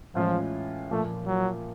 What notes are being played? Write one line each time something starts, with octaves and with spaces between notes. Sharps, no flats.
A2 E3 F3 G#3 C#4 F4
A#2 F3 A3 A#3
F#3